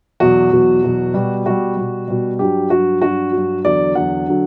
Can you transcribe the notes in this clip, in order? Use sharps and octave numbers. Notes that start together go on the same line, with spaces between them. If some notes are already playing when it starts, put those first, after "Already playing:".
E2 B2 F#3 F#4
E2 B2 F#3
E2 B2 F#3
B2 G3
B2 G3 F#4
B2 G3
B2 G3
G2 F#3 G4
G2 F#3 F#4
G2 F#3 F#4
G2 F#3
E2 D3 F#3 D5
E2 D3 F#3 F#5
D3 F#3